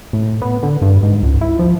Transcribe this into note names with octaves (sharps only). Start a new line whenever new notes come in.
A2
B3
D3
G2
G#2
C#2
E4
F3